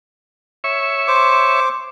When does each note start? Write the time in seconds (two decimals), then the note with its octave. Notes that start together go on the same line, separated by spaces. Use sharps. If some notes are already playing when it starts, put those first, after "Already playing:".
0.64 C#5 E5 C#6
1.08 C5 D6